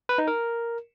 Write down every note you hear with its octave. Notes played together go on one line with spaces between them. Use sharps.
B4
D#4
A#4